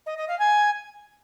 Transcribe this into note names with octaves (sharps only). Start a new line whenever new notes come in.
D#5
D#5
F5
G#5